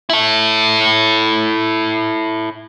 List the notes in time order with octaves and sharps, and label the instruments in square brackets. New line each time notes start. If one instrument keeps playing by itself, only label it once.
[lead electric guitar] E4 A4